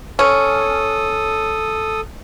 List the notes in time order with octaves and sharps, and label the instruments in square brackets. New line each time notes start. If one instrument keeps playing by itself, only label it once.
[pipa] C#4 [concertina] A4 D#6